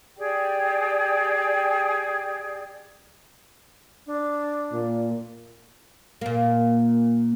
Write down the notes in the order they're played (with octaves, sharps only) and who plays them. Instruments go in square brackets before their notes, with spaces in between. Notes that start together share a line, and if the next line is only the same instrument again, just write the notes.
[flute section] G4 G#4 D5 G5
[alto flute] D4
[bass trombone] A#2
[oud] A#2 A#3